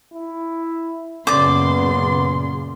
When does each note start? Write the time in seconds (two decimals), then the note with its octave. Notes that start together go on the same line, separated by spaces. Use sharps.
0.13 E4
1.27 F#2 A#2 C#3 B3 D5 C6 D6